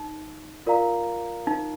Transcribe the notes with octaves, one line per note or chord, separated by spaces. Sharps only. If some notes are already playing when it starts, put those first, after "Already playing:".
Already playing: D#4
F4 A#4 D5 F5 A#5
D#4